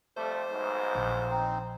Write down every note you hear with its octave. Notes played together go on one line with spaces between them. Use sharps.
F2 G3 A3 C5
B1 G#2
A#1
C4 D#4